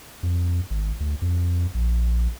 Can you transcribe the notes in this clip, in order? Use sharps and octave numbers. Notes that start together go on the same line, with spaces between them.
F2
G#1
D2
F2
A#1